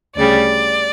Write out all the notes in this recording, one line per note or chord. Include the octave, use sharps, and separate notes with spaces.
D2 C#3 G3 D5